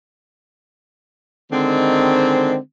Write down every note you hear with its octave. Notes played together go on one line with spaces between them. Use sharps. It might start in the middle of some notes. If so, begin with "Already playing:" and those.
D3 D#3 G#3 C4